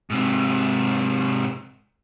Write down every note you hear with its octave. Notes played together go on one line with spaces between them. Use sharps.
G#2 C3